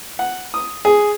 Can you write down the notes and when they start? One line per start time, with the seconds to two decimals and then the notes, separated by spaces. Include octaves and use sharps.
0.19 F#5
0.54 D#6
0.85 G#4